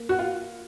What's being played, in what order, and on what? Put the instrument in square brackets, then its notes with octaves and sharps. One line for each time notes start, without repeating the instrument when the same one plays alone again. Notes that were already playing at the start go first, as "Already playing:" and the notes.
Already playing: [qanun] A#3
[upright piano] F#4
F4